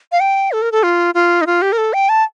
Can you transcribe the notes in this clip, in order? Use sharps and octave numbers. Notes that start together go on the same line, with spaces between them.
F5
G5
A4
A#4
A4
F4
F4
D#4
F4
G4
A#4
A4
G5
A5